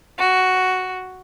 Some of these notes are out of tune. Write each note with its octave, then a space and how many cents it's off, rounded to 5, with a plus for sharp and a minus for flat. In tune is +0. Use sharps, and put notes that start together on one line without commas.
F#4 +5